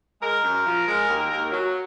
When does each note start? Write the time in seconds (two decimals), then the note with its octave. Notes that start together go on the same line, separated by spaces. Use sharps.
0.21 G#3 A#4
0.43 F#2
0.65 F3
0.87 G#3
1.08 D#2
1.30 D#2
1.51 F#3